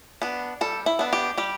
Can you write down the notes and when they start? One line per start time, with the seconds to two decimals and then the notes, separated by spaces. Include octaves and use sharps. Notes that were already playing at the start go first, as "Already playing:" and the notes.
0.22 B3 D4
0.61 G3 A4
0.86 E4
0.99 B3 D4
1.13 G4
1.38 G3 G4